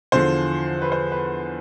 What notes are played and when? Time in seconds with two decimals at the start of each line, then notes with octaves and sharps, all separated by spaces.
0.12 E2 D3 F3 C5
0.82 B4
0.92 C5
1.12 B4